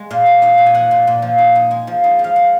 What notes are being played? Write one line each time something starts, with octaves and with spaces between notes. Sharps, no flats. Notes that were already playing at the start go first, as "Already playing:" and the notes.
Already playing: G#3
A#2 F5
A#2
D#4 F5
A#2
G#5
F3 F#5
A#2
A#2
F3
D#4
D#4
G#3
F3
D#4
F3
F5
F#5